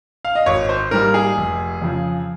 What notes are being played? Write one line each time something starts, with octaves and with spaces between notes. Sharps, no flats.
F5
D#5
G#1 C#5
C5
G#2 G3 A#3 A#4
G#4
F1
F2 C#3 F3